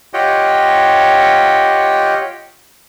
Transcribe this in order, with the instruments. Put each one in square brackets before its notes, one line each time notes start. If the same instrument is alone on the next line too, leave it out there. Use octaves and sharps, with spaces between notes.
[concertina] F4 G4 C#5 D#5 F#5 G5